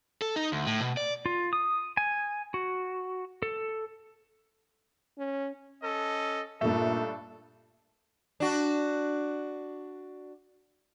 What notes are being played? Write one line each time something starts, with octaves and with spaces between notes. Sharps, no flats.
A4
D#4
D2
A2
B2
D5
F4
D#6
G#5
F#4
A4
C#4
C#4 A4 D#5
G2 A#2 A3 D4 D#4 A4
D4 F#4